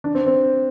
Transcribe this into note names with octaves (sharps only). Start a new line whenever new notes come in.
D4
C4
C4